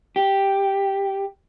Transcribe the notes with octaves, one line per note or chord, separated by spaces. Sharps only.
G4